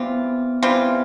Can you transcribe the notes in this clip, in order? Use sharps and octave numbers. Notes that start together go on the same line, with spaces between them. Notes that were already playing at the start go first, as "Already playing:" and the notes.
Already playing: E3 G3 B3 C4 F4
E3 G3 C4 F4